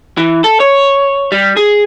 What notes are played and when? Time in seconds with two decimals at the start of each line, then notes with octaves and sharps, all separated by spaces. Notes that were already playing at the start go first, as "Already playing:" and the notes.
0.17 E3
0.44 A4
0.60 C#5
1.32 G3
1.57 G#4